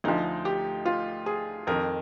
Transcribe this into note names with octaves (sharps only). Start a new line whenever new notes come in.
D2 D3 F3 D#4
G4
F4
G#4
F2 D#3 A#4